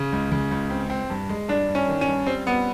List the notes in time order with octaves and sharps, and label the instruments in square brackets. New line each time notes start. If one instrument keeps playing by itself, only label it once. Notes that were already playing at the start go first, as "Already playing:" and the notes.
Already playing: [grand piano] C#3
C#2
C#3
C#2
C4
C4
G2
G#3
[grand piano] G2 [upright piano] D4
[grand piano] G2
[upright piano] C#4
[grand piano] D#3
[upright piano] C#4
[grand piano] G2
[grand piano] G3 [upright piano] C4
[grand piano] G3 [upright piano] B3